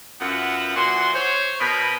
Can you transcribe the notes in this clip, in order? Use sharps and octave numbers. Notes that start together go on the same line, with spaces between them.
F#2 B3 F4 E5 F#5
A#2 E3 F#4 F#5 C6
C5 C#5
B2 A#4 D#5 B5